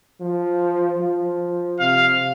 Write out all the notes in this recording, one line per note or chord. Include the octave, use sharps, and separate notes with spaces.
F3
F3
C3 F5